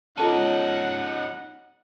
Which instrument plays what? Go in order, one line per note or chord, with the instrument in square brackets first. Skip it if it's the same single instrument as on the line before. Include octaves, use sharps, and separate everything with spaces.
[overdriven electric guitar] C#4 D#4 [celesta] F4 A4 A5 [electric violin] F#5